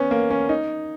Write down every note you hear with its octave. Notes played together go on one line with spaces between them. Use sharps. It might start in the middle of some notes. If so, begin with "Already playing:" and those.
Already playing: B3 C#4
A#3
C#4
D#4